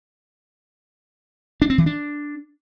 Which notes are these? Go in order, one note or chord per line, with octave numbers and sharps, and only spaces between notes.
D4
C4
E3
D4